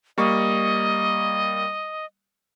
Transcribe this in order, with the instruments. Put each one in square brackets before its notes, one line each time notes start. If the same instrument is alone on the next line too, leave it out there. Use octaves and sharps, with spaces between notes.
[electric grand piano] G3 A#3 C#6 [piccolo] D#5